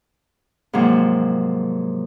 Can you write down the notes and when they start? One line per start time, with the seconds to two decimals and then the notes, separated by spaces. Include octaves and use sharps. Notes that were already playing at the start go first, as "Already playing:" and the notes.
0.73 G#2 C3 F3 F#3 A#3